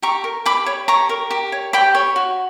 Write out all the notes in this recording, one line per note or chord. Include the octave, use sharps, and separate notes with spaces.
G4 A#5 C#6
A#4
G4 B5 D6
C#5
G4 A#5 C#6
A#4
G4
C#5
G4 G5 B5
C#5
F#4